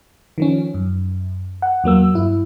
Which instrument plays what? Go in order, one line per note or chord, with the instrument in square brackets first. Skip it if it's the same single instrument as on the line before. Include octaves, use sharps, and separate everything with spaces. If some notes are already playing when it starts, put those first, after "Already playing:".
[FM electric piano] D#3 F3 C#4
F#2
F#5
E2 F#3 A#3 E6
G2 E4